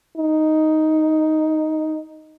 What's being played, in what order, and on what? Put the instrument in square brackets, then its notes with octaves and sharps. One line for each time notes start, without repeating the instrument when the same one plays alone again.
[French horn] D#4